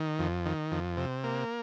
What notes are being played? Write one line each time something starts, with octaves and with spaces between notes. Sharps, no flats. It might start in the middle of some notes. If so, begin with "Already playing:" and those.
Already playing: D#3
F2
D#3
F2
C3
A#3